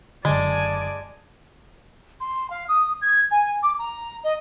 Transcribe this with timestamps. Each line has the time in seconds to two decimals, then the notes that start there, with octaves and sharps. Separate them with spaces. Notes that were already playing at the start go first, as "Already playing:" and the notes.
0.25 F#1 D3 G#3 D5 G#5 A5
2.20 C6
2.50 F5
2.68 D#6
3.02 G#6
3.31 G#5
3.63 D6
3.79 A#5
4.24 D#5